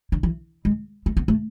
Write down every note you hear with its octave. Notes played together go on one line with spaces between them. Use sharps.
D3
E3
G#3
A3
B3
A3